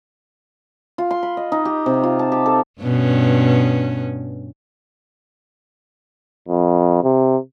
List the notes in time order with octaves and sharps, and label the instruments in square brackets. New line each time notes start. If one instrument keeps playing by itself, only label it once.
[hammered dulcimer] F4
C6
B5
D#5
D#4
G4
C3
F4
A5
G4
A4
[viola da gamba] G2 B2 C#4
[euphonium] F2
C3